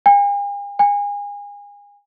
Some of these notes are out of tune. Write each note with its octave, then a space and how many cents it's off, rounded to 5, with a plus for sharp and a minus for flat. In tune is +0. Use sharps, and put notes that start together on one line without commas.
G#5 -45
G#5 -30